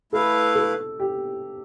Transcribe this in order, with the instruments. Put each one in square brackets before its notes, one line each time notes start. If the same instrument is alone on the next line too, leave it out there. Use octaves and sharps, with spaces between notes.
[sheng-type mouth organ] A3 E4 B4 F5 [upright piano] A4
[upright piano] A4
G4